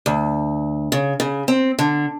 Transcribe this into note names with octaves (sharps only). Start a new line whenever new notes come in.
D2
C#3
C#3
C4
D3